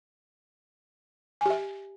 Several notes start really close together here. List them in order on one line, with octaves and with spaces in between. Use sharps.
G#5 G4 E5